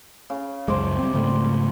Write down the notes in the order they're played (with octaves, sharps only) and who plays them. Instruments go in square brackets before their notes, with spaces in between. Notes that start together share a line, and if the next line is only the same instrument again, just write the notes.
[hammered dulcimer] C#3
[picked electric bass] C#2 F#2 G#3 [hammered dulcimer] C5 D6
[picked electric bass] G3 C4
[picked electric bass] G#2 C#3 A3 [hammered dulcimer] G3